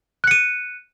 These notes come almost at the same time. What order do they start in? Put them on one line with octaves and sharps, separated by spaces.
F#6 C#7 D#7